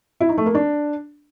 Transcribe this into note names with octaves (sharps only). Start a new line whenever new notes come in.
E4
D#4
A3
A#3
D4